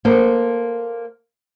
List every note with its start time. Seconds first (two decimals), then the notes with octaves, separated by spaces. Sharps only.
0.05 A#3 A4 C5